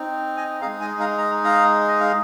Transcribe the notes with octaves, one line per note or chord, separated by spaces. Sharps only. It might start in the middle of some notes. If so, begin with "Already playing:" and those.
Already playing: C4 D#4
D#5 G#5
G#3 D#4 G#4 F5 A#5
D#5 G#5
F5 A#5
A#5
F5 A#5
D#5
F5